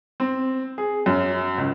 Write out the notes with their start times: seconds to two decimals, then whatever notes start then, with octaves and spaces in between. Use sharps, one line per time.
0.20 C4
0.78 G#4
1.06 F#2
1.58 C#2